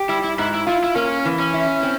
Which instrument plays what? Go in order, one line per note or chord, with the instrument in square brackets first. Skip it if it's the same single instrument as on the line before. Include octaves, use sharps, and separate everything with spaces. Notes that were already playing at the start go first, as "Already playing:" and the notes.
Already playing: [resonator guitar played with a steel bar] G4
[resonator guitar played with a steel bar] G3 [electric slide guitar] E4
[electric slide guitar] E4
[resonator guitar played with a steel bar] G#2 [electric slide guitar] E4
[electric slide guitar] E4
[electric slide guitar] E4 [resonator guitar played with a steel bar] F4
[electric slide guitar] E4
[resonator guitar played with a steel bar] A#3 [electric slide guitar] C#4
[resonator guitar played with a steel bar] E3
[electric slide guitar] C#4
[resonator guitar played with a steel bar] E4
C4